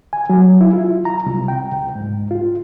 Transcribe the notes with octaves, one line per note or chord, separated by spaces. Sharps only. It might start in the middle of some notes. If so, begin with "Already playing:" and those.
G#5
F#3
E4
F4
A#5
C2
G5
C#2
G#2
F4